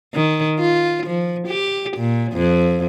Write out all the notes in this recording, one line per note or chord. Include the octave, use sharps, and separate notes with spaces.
D#3
F4
F3
G4
A#2
F2